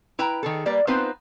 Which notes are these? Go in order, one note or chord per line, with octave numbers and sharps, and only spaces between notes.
E4 B4 G5 A#5
D#3 G#4 A4
G3 A#3 B4 D5
B3 C4 D#4 F4 B4 C5